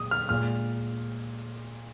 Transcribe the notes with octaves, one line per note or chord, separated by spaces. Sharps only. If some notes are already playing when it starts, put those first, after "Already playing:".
Already playing: A#2 G#3 D#6
F6
A#2 G#3 F6